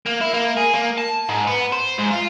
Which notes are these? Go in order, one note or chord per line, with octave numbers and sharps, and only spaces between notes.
A#3
E4
A#3
G#4
A#3
A5
G#2
B3
C5
G#2
F4